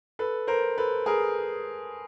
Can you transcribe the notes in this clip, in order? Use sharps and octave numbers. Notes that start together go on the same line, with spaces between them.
A4 B4
A#4 C5
A4 B4
G#4 A#4